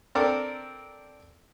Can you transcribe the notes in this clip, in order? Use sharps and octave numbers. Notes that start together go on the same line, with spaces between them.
C4 D4 A4 A#4 D6